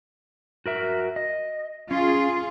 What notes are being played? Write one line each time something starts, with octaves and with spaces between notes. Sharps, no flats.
F#4 A#4 E5
D#5
C#4 F4 G#4